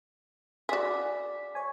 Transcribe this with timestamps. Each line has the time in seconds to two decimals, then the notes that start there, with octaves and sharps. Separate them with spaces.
0.69 F#4 G#4 D5 B6
1.55 C#5 G#5